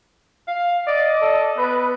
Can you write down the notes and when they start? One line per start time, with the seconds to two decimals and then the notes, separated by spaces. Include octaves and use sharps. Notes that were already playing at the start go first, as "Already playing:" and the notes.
0.48 F5
0.87 D5 D#5
1.21 A4
1.58 B3 B4